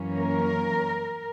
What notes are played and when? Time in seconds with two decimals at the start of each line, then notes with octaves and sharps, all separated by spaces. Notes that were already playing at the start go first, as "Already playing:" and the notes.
Already playing: F#2 E3 A#3 C#4
0.16 A#4